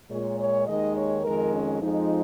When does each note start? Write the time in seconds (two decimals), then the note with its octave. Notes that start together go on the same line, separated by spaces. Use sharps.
0.10 A#2 G#3 C#5
0.39 C#5
0.67 D#2 D#3 G#3 D#5
0.96 C#5
1.24 F2 D#3 G#3 A#4
1.53 C#4
1.82 F2 F3 G#3 D#4